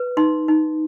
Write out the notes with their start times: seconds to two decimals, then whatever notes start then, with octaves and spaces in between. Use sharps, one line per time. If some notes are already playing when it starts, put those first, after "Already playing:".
Already playing: B4
0.17 D#4 C6
0.48 D#4